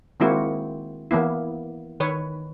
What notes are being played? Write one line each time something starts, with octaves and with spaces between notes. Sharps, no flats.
D#3 G#3 A#3 C4 E4 F#4
E3 A#3 B3 E4
D#3 B4 C#5